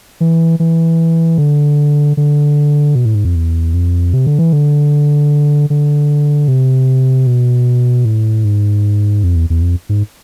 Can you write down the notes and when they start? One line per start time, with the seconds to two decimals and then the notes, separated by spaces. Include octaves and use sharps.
0.21 E3
0.60 E3
1.38 D3
2.17 D3
2.95 B2
3.05 A2
3.15 G#2
3.25 F2
3.35 E2
3.74 F2
4.14 C3
4.27 D3
4.39 E3
4.53 D3
5.70 D3
6.48 C3
7.27 B2
8.05 A2
8.44 G#2
9.24 F2
9.36 E2
9.50 E2
9.62 F2
9.89 G#2